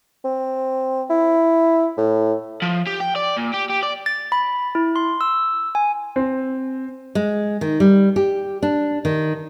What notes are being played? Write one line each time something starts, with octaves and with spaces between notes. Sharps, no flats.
C4
E4
A2
F3
G4
G5
D5
A#2
G4
G4
D5
A6
B5
E4
C6
E6
G#5
C4
G#3
D#3
G3
G4
D4
D#3